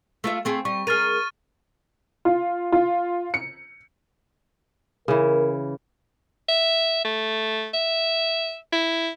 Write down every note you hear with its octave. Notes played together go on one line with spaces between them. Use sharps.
A3 F4 E5
A3 C4 G#4
G3 C#6
G#4 A#4 F6 A6 D#7
F4
F4
C#7
C#3 E3 A#4
E5
A3
E5
E4